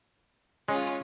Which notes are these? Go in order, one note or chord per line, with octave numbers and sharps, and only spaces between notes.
G#3 C#4 F4